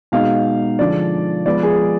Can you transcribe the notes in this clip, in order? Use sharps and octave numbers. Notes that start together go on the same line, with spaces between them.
B2 G#3 D#4 F5
D3 F3 G#3 D4 D5
F3 G#3 B3 D5
G#4